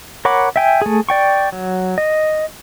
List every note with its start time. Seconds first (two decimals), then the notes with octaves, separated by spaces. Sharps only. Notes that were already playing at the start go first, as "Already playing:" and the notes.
0.25 A#4 C#5 F#5 B5 D6
0.56 E5 G5 G#5
0.82 A3 G#4
1.09 D5 G5 C#6
1.52 F#3
1.98 D#5